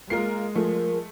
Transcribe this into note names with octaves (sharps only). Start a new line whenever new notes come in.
G#3 A#3 F4 A#4 C7
F3 A3 A#4